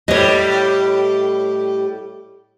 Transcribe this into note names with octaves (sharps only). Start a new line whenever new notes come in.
A2 G3 C#5 D#5